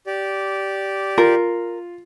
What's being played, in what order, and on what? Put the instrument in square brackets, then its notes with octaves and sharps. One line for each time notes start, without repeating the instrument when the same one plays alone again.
[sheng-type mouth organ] G4 D5
[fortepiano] F4 [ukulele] A#4